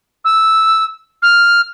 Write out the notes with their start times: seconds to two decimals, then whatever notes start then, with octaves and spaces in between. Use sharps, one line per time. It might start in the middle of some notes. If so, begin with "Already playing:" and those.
0.25 E6
1.22 F6